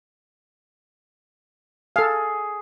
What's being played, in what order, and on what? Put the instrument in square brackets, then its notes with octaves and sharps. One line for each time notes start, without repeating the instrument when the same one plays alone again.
[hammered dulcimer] G#4 [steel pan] A4 F5